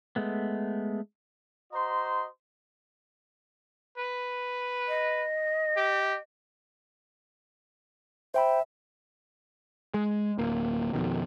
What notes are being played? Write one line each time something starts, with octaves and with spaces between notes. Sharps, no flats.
G#3 A3 B3
F#4 C5 D#5 A#5 C6
B4
D#5
G4
C5 E5 G5 B5
G#3
D1 A#3
F2 G#2 B2 D#3